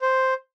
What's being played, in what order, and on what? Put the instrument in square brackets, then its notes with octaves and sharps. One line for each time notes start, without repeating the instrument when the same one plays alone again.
[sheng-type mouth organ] C5